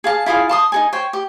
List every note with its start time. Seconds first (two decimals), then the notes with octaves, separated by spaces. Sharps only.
0.04 G#4 F5 A5
0.26 E4 F4 G#4 F5
0.49 A5 C6 D#6
0.72 D#4 A4 G#5
0.93 C5 C#5 G5
1.13 G4